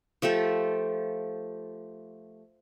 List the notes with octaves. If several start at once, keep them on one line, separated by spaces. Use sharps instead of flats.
F3 A3 G4 A4